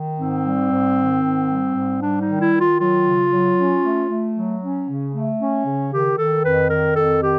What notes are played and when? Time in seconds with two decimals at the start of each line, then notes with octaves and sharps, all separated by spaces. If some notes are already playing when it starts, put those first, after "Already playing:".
Already playing: D#3
0.19 G#2 C4
0.45 G3
0.71 G#2
0.98 D#3
1.23 G#2
1.49 G3
1.75 G#2
2.02 G3 D4
2.21 D#4
2.28 D#3
2.41 E4
2.53 D#3
2.60 F4
2.80 F#3 F4
3.06 C#3
3.31 F#3
3.57 C#4
3.84 A3
4.10 A3
4.36 F#3
4.62 C#4
4.88 C#3
5.14 A3
5.40 C#4
5.65 C#3
5.92 D#3 G4
6.18 D#3 A4
6.45 F2 B4
6.70 D#3 A#4
6.96 F2 A4
7.22 D#3 G4